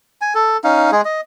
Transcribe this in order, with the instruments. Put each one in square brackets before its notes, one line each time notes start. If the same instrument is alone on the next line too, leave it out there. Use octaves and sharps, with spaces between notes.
[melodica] G#5
A4
C#4 D#4 F5
G#3 G#4
D#5